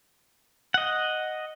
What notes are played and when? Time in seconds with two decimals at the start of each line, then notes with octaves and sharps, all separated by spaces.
0.74 D#5 F#5